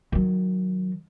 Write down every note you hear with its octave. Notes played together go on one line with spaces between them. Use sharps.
D#3 F#3